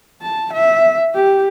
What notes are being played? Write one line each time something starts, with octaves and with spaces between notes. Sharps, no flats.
A5
E5
G4